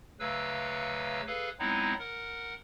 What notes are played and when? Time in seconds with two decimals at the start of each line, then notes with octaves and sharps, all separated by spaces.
0.20 D2 C#3 F#3 B4 F5 E6
1.27 G#4 A4 B4 F5
1.59 F#3 G#3 B3 C4 D#4 E4
1.99 A#4 F#5